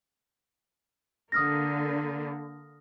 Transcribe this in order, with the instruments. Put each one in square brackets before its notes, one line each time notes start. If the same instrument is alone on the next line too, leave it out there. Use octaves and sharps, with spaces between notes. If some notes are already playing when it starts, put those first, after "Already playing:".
[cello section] D3 A#3 [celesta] D#6 F6 A#6